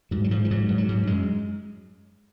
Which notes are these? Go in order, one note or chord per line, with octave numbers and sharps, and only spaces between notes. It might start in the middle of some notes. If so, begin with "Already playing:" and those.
G#2 F#3
F#3
G#2 F3
F3
G#2 F#3
G#2
F#3
G#2
F#2 G#3